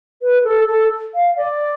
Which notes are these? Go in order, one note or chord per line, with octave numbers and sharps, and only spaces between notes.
B4
A4
A4
F5
D5